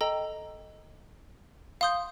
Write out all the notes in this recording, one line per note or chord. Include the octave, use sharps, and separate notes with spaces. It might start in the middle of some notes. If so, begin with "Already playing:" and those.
A4 D#5 G5 A#5
F5 C6 D#6 G6